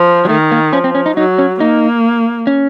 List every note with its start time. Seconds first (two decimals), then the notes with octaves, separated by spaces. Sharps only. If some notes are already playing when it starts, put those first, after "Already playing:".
Already playing: F3
0.25 F#3
0.29 D#3 A3
0.52 A#3
0.73 F3 C#4
0.84 C4
0.95 C#4
1.06 D#4
1.17 F#3 D#4
1.39 C#4
1.60 A#3 D#4
2.47 C#4